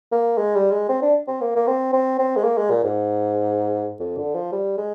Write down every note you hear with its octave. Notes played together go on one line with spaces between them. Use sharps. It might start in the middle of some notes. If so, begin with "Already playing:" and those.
A#3
G#3
G3
G#3
C4
D4
C4
A#3
A#3
C4
C4
C4
G#3
A#3
G#3
A#2
G#2
F2
D3
F3
G3
G#3